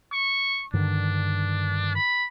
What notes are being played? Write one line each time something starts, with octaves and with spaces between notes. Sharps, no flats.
C#6
G2 D3 D#3 D4
B5